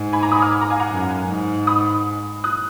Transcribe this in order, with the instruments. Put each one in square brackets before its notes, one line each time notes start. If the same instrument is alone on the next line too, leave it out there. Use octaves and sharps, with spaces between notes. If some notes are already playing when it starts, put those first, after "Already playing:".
Already playing: [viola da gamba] G#2
[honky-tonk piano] G#5 B5
A#5 D6
B5 D#6
D6 F6
A#5 D6
F5 G#5
F#5 A#5
[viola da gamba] F#2
G#2
[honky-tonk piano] B5 D#6
D#6 F#6